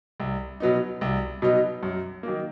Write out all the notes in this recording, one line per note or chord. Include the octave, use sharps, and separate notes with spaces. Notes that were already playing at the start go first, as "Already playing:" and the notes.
C2
B2 F#3 B3 D#4
C2
B2 F#3 B3 D#4
F#2
D#3 F#3 A#3